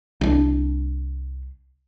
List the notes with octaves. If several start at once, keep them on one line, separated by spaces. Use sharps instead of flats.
C2 G#3 D4